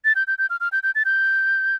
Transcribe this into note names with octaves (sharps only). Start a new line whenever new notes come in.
A6
G6
G6
G6
F6
F6
G6
G6
A6
G6